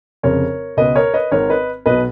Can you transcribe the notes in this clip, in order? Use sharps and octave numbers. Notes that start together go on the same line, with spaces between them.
F1 F2 C#3 A#4 C#5
C#2 B2 B4 D#5
A#4 C#5
B4 D#5
G#1 G#2 D#3 A#4 C#5
B4 D#5
B1 B2 B4 D#5